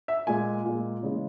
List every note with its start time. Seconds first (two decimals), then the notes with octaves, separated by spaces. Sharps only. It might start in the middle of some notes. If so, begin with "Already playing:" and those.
0.08 E5
0.27 A#2 G#3 G#5
0.65 A#2 G#3
1.03 C#3 E3 G#3